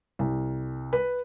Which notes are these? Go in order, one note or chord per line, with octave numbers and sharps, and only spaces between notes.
C2
B4